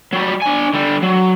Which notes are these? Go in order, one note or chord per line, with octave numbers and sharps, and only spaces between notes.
F#3 G3
D4 G#5
D3 G3
F#3